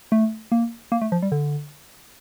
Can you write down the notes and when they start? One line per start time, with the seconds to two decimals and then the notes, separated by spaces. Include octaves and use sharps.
0.12 A3
0.52 A#3
0.92 A#3
1.02 A3
1.12 F3
1.23 G3
1.32 D3